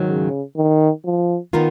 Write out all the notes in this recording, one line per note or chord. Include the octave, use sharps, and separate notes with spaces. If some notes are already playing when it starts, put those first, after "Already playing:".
Already playing: G#2 D#3 F#3
C#3
D#3
F3
D#3 B3 F4 A#4